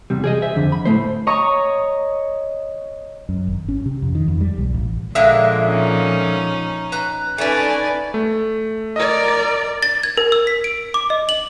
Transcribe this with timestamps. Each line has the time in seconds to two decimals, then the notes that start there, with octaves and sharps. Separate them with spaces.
0.10 E2 C3 G3
0.24 G#4 D5 D#5
0.42 C5 E5
0.56 F2 D3
0.72 B5
0.85 A2 A3 C5
1.27 C#5 D#5 A#5 C#6 D#6
3.29 F#2
3.48 G#1
3.68 C#4
3.86 C3
4.02 F2
4.15 D#3
4.28 F2
4.41 G3
4.58 B1
4.74 A1
5.15 A#2 D3 F3 G#3 A#3 E5
5.65 C#4 D#4
6.92 B4 A#5
7.38 A3 C#4 D#4 B4 D5 G#5
8.14 A3
8.96 A#4 D5 D#5
9.83 A6
10.03 G#6
10.17 A#4
10.32 E6
10.47 B6
10.64 D7
10.94 D6
11.10 D#5
11.29 F#7